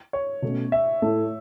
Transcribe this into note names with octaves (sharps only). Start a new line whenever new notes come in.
C#5
B2 A3 C#4
E5
A2 A3 E4 A4